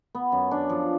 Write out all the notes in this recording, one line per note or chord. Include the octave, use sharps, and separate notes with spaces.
B3
F#2
D4
F3